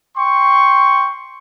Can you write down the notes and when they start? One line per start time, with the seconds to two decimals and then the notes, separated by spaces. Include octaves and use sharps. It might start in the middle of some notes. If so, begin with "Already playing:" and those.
0.17 G5 C6 C#6